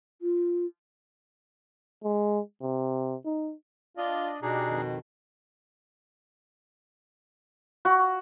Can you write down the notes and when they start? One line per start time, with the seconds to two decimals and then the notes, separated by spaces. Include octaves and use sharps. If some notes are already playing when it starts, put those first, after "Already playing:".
0.22 F4
2.04 G#3
2.62 C3
3.25 D#4
3.97 D4 F4 D5 D#5
4.42 B2 D4 D#4 G4 G#4
4.69 F2 D#3
7.85 F#4